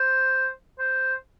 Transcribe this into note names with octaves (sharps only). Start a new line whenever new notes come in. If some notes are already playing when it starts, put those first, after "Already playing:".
Already playing: C5
C5